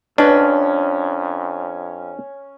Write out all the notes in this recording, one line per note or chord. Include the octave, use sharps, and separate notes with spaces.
F2 C#4 D4 B4 D#5